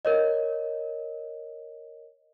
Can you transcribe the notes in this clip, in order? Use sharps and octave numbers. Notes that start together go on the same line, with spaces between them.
A#4 C#5 D#5